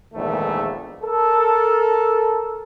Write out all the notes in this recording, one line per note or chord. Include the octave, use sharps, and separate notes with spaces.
A#1 E2 G#2 D#3 A3
A4 A#4